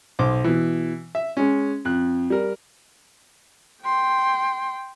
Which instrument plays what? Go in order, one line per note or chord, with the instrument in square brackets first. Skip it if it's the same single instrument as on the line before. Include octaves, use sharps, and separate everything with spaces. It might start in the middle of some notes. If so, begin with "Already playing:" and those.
[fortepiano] B1 C5 D6
B2 E3
E5
G#3 C#4
F2 F#6
G3 A#4
[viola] G5 C6